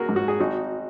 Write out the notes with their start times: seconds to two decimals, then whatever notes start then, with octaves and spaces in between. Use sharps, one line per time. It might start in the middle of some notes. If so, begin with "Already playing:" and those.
Already playing: A#3 F#4 G#4 A#4
0.09 G#2
0.16 F#4
0.28 G#4
0.40 G#1 D#4 F#4